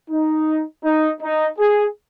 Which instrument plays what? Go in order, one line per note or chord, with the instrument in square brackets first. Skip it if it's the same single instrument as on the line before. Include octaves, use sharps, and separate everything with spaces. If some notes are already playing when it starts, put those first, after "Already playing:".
[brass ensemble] D#4
D#4
D#4
G#4